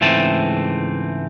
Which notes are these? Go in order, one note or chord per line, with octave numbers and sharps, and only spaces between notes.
C#2 G#2 E3 A3 C4 A5